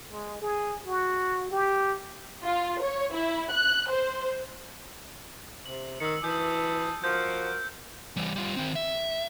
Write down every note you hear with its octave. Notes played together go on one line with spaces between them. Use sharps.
G#3
G#4
F#4
G4
F4
C#5
E4
F#6
C5
C3 F#7
D#3 E6 C#7
E3 A5 D#6 G6
F3 F4 F#4 A#4 G6
E3 G3
G3 F4
D#3 C4
E5